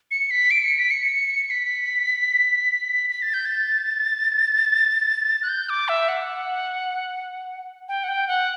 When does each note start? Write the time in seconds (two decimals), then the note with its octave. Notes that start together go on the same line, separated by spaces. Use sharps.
0.11 C#7
0.31 B6
0.51 D7
0.64 C#7
0.78 B6
0.91 C#7
1.50 B6
3.10 B6
3.22 A6
3.34 G6
3.46 A6
5.43 F#6
5.49 G6
5.69 D6
5.89 E5
6.08 F#5
7.88 G5
8.04 F#5
8.08 G5
8.28 F#5